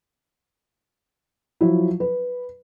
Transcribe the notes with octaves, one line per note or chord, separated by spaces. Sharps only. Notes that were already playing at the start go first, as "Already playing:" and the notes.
F3 F#3 E4
B4